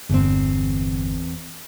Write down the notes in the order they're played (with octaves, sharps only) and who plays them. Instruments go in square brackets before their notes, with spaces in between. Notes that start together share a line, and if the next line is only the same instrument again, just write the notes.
[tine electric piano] G1 [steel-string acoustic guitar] E2 C4